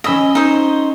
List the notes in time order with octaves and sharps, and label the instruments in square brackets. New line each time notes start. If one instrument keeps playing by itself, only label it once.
[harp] C#4 E6 A#6 [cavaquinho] D#5 B5
[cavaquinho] D#4 C5